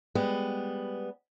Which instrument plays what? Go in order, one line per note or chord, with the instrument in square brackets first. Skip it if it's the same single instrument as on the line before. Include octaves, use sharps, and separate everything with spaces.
[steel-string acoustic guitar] G3 G#3 B3